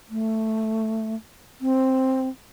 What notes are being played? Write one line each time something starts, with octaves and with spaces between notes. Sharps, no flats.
A3
C4